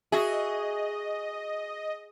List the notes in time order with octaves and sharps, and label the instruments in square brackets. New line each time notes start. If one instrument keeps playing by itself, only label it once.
[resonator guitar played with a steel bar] F#4 E5 [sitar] G#4 [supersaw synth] D#5